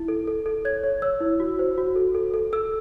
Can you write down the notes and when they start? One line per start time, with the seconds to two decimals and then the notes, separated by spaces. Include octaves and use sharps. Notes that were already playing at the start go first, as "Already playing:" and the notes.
Already playing: E4
0.08 A4
0.28 A4
0.46 A4
0.65 C#5 G#6
0.84 C#5
1.02 C#5 E6
1.21 E4
1.40 F#4
1.59 C5
1.78 F#4
1.96 A4
2.15 A4
2.34 A4
2.53 A4 E6